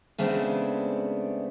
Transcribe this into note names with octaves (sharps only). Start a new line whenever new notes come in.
C#3 G#3 A3 B3 C4 D4